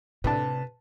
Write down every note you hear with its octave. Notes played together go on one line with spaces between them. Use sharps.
A2 C3 D4 B4 A5